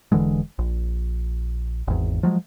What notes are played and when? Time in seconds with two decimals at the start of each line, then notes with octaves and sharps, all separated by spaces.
0.12 E1 D3 E3 G#3
0.59 A#1
1.88 G#1 E2
2.23 F3 F#3 G#3